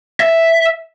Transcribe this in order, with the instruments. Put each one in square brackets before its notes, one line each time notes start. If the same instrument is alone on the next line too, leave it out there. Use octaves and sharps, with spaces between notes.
[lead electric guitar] E5